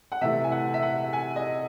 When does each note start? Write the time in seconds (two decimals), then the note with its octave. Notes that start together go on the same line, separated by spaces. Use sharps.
0.12 F#5
0.21 C3 E3 A3 E5
0.44 G#5
0.52 F#5
0.74 E5
0.82 F#5
1.13 G#5
1.36 D#5